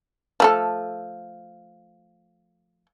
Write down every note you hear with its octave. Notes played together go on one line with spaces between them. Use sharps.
F3 A3 A4